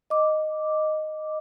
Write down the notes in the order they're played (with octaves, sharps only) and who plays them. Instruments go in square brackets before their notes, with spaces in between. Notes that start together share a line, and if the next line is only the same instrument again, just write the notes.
[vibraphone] D#5 D6